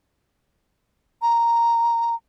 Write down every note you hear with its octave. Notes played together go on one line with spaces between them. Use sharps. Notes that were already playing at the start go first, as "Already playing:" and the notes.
A#5